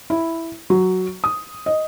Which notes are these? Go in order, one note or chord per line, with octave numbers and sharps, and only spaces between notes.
E4
F#3
D#6
D#5